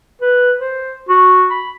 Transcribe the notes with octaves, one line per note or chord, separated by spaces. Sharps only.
B4
C5
F#4
B5